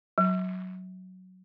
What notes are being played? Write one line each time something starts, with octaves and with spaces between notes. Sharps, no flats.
F#3